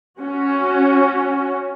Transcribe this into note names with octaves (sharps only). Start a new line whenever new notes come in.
C#4 F#4